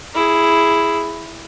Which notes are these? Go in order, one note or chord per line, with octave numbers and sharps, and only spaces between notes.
E4 G#4